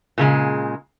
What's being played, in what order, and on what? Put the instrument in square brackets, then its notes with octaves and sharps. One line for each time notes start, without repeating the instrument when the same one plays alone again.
[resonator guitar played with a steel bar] A#2 C#3 G#3